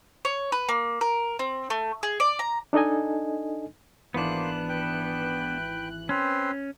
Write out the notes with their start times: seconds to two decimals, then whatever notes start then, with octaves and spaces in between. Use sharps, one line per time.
0.25 C#5
0.52 B4
0.69 A#3
1.01 A#4
1.39 C4
1.70 A3
2.03 G#4
2.20 D5
2.39 A#5
2.73 D4 D#4 A4 D#5 G#5
4.14 G#1 E3 A#3 B3 D4 C5 F#6
4.69 B4 G5
6.09 C4 C#4 B4 C5